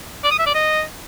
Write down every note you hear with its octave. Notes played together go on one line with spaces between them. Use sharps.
D5
D#6
E5
D5
D#5